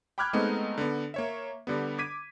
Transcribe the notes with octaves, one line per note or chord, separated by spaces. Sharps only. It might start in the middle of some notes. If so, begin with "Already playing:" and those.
G5 B5 D6 F6 F#6 G#6
G#3 A3 B3 C4 D#4
D3 B3
A#3 C#5 E5
D3 G3 B3
D6 G#6 B6 D#7